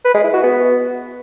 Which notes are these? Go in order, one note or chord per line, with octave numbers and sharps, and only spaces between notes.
B4
G#3
E4
F#4
B3